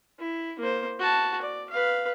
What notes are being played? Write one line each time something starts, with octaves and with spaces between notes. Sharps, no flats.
E4
A#3 C5
F#4 A5
D5
B4 F5